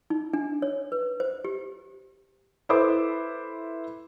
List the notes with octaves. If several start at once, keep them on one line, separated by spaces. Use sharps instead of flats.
D#4
D4
C#5
B4
C5
G4
E4 A4 B4 C5 D6